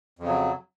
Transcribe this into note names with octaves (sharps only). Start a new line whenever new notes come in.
F2 C#3 F#3